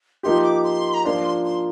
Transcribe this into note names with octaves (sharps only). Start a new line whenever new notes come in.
F3 A#3 D#4 G4 C6
D6
C6
A#5
F3 A#3 D4 F4 C5 C6
C6